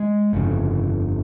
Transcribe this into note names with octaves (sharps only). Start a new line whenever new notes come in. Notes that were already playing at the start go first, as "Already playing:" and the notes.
Already playing: G#3
G1 F2 C#3